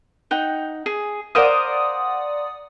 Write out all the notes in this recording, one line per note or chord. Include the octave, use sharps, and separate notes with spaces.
D#4 F#5 G5
G#4
A#4 C5 D5 F5 F#5 D#6